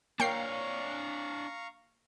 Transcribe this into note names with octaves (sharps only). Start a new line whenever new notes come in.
A#3 D4 C#5 F5 G5 A#5 C#6 C7